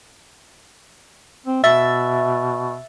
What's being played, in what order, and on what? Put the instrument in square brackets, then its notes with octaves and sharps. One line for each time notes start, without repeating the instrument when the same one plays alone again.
[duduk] C4
[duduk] B2 [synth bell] E5 E6 A6